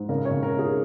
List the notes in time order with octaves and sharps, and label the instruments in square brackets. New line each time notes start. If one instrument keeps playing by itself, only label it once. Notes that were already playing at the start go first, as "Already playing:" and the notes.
Already playing: [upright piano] G#2
C#3 A#4
C#5
C#3
A#4
D#4
G#4